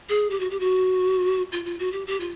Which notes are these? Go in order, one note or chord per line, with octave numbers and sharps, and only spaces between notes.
G#4
G4
F#4
G4
F#4
F4
F4
F#4
G4
G4
F4